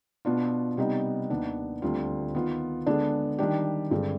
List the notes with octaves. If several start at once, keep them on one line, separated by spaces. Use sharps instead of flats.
B2 B3 D4 F4
C3 G3 B3 D#4
D#2 D#3 B3 D4
D2 D3 G3 C4 F4
D#3 B3 F4
D3 G#3 B3 D4 G#4
D#3 G3 D4 G4
G2 D3 G#3 C4